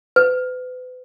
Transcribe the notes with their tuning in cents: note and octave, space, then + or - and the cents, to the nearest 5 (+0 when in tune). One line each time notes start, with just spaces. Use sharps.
B4 +40